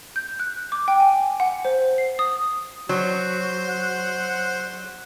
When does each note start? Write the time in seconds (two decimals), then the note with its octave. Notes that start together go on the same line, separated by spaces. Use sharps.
0.16 G6
0.40 F#6
0.72 D6
0.88 G5
1.00 G#5
1.40 F#5
1.65 C5
1.98 C7
2.19 D#6
2.89 F#3 F#4 C5
3.69 F#5